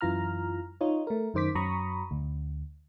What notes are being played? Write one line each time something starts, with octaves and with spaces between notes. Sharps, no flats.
F#2 E3 F4 A#5 F6
D#4 F4 C#5
A3 A#4
F#2 D#3 C5 D6 B6
F#2 F#3 A#5 B5 C#6 D#6
D2